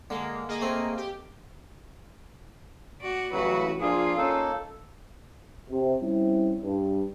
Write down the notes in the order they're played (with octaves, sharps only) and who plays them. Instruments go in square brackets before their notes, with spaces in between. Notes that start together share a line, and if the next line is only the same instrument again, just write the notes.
[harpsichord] D3 [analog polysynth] G#3 A#3
[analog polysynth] A#3 G#4 D#5
[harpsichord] A3 C4
[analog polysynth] G4
[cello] F#4 D5
[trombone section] A1 [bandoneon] A2 C#3 [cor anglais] F#3 [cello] F#4 B4
[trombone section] F3 D4 [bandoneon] A#3 [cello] F4 [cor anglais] G#4
[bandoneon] A#3 D#4 [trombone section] C#4 [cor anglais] A4
[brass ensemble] C3
G3 C4 C#4 E4
G2